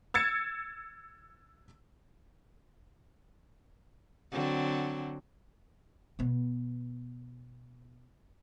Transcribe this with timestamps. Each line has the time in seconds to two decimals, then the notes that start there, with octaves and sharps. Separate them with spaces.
0.14 E6 G#6 A6 C#7 E7
4.32 D3 F#3 C4
6.19 B2 B3